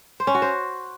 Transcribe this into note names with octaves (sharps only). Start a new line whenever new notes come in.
C5
C#4
F#4
C5